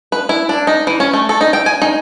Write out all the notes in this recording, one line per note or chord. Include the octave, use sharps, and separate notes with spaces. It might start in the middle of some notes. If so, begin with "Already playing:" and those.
B4
E4
D4
D#4
E3
C#4
A3
A4
D#4
G5
G#5
D#4